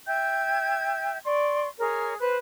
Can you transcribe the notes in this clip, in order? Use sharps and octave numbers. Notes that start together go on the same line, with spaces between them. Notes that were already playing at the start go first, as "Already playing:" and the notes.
E5 G5 G6 G#6
D5 C6 C#6
G#4 A#4 C#5
B4 C5 F#6